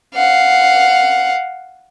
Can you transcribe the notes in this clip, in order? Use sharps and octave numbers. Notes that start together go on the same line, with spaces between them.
F5 F#5